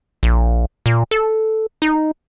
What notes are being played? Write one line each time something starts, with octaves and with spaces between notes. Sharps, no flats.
A#1
A#2
A4
D#4